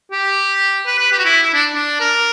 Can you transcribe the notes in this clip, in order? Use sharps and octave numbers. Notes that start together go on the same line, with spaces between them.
G4
B4
B4
G4
F#4
E4
E4
D4
D4
A#4